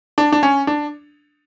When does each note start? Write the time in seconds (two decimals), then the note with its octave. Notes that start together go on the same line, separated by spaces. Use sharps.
0.18 D4
0.32 D4
0.43 C#4
0.67 D4